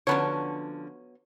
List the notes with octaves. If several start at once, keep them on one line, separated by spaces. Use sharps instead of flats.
D3 F3 F#3 B3 C#4 C#5